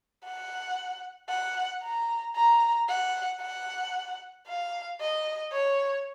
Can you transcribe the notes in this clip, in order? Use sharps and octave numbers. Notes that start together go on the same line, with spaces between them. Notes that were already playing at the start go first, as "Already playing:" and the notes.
F#5
F#5
A#5
A#5
F#5
F#5
F5
D#5
C#5